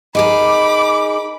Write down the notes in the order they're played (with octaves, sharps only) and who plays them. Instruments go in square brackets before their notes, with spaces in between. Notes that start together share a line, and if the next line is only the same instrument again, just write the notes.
[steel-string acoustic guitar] D#4 G#4 A#4 [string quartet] B5 D6